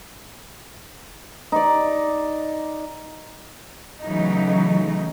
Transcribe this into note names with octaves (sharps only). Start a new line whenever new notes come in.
D#4 D5
C#3 E3 F#3 A3 D#4